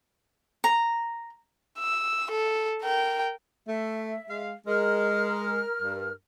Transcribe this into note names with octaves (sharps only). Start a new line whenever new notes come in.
A#5
E6
A4
A#4 G5
A3 E5
G#3 F5
G#3 A#4 F6
G2